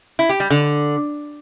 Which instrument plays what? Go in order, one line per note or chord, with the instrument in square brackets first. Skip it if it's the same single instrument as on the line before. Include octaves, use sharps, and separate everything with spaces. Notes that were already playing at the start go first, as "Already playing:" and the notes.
[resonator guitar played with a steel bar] E4
G4
G3
D3